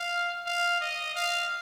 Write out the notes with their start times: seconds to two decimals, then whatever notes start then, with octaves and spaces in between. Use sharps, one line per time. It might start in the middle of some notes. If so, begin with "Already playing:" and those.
Already playing: F5
0.46 F5
0.81 D#5
1.15 F5